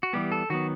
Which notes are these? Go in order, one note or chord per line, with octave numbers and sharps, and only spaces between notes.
F#4
E3 G3 B3 G4
A4
D#3 F#3 B3 F#4